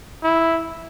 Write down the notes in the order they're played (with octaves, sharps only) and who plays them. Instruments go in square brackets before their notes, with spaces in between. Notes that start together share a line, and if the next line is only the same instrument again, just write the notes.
[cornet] E4